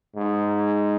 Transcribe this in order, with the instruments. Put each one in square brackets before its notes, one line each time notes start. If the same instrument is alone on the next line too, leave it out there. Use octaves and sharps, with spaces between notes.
[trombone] G#2